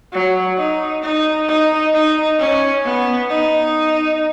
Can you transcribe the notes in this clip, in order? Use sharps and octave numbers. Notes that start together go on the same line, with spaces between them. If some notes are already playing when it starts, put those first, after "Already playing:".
F#3
D#4
D#4
D#4
D#4
C#4
B3
D#4